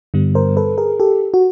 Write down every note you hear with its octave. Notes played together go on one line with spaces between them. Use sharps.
G2 D3 G3 B3
A#4 C5
A4 B4
G#4 A#4
G4 A4
F#4